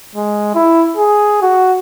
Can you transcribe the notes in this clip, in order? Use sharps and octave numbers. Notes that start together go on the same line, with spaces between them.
G#3
E4
G#4
F#4